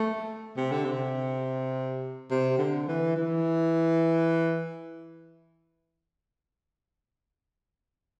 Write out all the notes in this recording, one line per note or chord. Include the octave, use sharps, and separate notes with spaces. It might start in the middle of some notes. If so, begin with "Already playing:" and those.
Already playing: A3
C3
D3
C3
C3
D3
E3
E3